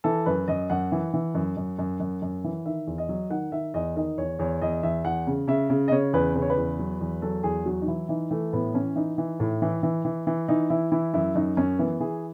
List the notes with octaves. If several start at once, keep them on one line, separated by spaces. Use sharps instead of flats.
E3 A4
F#2 B4
F#2 D#5
F#2 F#5
E3
E3
F#2
F#2
F#2
F#2
F#2
E3
D#3 E5
E2
D#5
F#3
D#3 F#5
D#3 E5
E2 D#5
D#3 D#5
E2 C#5
E2 C#5
E2 D#5
E2 E5
E2 F#5
C#3
C#3 E5
C#3
D#5
C#3 C#5
E2 B4
C#3 B4
C#5
B4
E2
F#3
E2
F#3 A4
E2 G#4
F#3 F#4
D#4
E3 E4
E3 D#4
E3 A3
A2 B3
E3 C#4
E3 D#4
E3
A2
E3
E3
E3
E3
E3 D#4
E3 E4
E3 E4
F#2 E4
F#2 D#4
F#2 C#4
E3 B3
E3 G#4